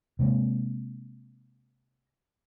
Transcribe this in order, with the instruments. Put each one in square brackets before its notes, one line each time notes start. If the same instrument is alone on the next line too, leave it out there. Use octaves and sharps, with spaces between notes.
[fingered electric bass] C3 G#3 A#3